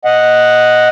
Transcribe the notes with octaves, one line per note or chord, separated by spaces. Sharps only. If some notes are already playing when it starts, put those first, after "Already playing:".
D#5 F#5